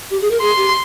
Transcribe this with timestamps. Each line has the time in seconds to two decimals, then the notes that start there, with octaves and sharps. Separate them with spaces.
0.10 G4
0.22 G#4
0.31 A#4
0.41 G#4 C6
0.56 G4